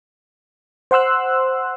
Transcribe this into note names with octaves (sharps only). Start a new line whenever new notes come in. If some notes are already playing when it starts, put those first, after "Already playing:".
C5 F#5 C6 E6 F#6